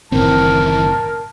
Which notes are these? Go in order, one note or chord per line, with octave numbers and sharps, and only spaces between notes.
F#1 A2 D#3 E3 C4 A#4 A5